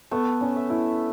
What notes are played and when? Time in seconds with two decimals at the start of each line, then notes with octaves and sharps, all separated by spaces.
0.11 A3 B3
0.41 C#4
0.56 E5
0.70 E4